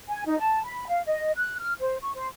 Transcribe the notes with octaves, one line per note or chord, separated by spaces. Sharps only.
G#5
D#4
A5
B5
F5
D#5
F#6
F6
C5
C#6
C5